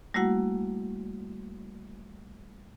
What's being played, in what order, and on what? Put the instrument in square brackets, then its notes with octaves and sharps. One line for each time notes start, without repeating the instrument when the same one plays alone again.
[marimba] G3 A3 A#3 E4 F#4 F#5